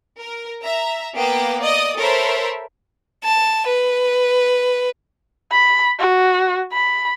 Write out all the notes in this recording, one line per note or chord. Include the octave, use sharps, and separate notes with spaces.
A#4
E5 A#5
A#3 B3 B4 G5 D6
D5 D#5 D#6
A4 A#4 C5 C#5 E5 B5
A5
B4
B5
F#4
B5